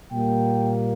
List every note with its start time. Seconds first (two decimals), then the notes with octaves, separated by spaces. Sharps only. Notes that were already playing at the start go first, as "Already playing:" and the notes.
0.10 A#2 G3 A#3 G5